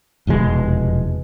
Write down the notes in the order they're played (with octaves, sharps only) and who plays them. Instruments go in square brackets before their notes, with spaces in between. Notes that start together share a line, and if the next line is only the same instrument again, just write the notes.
[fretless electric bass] F1 E2 B2 G#3